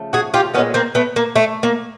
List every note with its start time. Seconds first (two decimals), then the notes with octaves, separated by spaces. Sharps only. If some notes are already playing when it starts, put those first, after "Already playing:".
Already playing: C#3 F3 A3
0.13 F#4 G#4
0.34 F4 G4
0.54 A#2 F3 B3 C#4
0.58 G#3
0.74 A#3 C4
0.95 A3 B3
1.16 A#3
1.36 A3
1.63 A#3